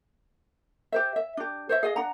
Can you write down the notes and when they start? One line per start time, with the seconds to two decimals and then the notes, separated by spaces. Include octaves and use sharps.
0.92 G4 C5 E5
1.16 E5
1.37 D4 G4
1.69 C5 C#5 E5
1.83 G#4 D#5 F5
1.96 D4 F#5 A#5